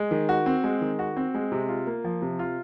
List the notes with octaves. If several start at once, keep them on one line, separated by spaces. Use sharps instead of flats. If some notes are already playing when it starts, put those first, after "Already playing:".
Already playing: G#3
D#3
F#4
C4
G#3
D#3
F#4
C4
G#3
C3
F4
A#3
F3
C3
F4